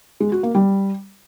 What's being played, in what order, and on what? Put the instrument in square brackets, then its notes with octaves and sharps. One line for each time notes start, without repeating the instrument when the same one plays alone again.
[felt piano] G#3
F#4
A#3
G3